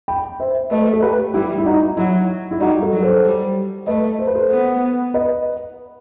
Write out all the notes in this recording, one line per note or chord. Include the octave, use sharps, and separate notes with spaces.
G5 B5
C5 E5
A3 B4 D#5
A4
G4 B4
G3 E4 G4
E4
D#4 F#4
F#3 E4
E4
G3 D#4 F#4
F#4 A4
F#3
A4 C5
G3
A3 B4 D#5
C5
B4
A4 C5
B3
B4 D#5